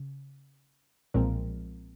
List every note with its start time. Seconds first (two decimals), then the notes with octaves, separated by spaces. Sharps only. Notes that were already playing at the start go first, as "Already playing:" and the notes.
Already playing: C#3
1.14 B1 A#2 F3 G#3 C4 A#4